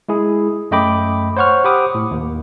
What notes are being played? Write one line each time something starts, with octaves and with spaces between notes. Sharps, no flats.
G#3 E4 G#4
F#2 A3 D#5 G5 B5 D6
C5 C#5 F#5 C#6 F6
G4 C5 F#5 B5 D6 D#6
A2
D#2